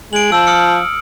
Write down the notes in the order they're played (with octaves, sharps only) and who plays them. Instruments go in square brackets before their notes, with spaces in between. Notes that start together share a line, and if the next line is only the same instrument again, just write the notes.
[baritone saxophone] G#3 [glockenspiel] D7 F#7
[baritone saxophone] F3 [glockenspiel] E6
[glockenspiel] D#6 F6 C#7